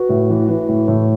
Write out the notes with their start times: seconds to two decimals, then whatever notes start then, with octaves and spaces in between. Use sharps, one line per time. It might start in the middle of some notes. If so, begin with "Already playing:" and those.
Already playing: F#4 B4
0.09 A2
0.30 E3
0.49 E3
0.69 A2
0.88 A2